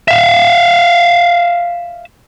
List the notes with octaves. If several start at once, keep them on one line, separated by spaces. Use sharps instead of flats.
E5 F5